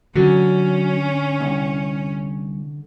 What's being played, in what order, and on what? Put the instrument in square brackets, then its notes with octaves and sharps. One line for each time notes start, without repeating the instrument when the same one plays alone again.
[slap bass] D3 [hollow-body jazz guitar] F#3 [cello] C#4
[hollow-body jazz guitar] C2